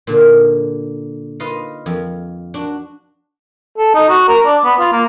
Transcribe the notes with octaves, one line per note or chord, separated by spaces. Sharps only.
A#2 D3
F4 B4 D#5 F5
F2
D4 F#4
A4
D#4
F#4
A#4
D4
B3
F4
A#3